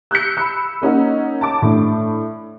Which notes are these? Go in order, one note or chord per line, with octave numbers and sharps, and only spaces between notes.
E6 F#6 G6 C#7
B5 E6
A#3 C#4 D#4 F#5
A5 D6
A2 D4